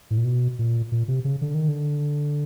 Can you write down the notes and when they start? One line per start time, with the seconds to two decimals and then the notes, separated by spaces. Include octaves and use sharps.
0.11 A2
0.18 A#2
0.25 B2
0.59 A#2
0.92 A#2
1.08 C3
1.25 C#3
1.42 D3
1.55 D#3
1.68 D3